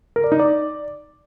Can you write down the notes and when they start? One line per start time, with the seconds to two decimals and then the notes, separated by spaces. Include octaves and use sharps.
0.16 A#4
0.24 D5
0.32 D#4
0.40 D5